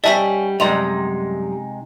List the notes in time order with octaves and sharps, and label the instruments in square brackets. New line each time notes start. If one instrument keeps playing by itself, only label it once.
[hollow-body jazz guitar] G3 E5 [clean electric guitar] C#4 [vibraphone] G4 F#5 [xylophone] D#5 A5 B6
[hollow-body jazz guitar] F#2 G3 [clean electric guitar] C3 G#3 D#4 [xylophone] D#5 C6 F7